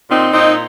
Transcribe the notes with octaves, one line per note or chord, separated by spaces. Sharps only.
A#2 C4 D#4
A#2 C4 D#4